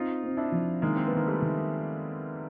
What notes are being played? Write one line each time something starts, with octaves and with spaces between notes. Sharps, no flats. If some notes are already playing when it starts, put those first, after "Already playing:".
Already playing: C4 D#4 F4
C4
D4 E4
F3
D#3 G#3 A#3
C4
B3
D#3 A#3
G3 A3
D#3